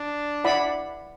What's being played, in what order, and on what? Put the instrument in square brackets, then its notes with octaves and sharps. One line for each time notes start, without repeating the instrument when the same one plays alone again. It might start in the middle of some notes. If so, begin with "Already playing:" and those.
Already playing: [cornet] D4
[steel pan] E4 D5 F#5 B5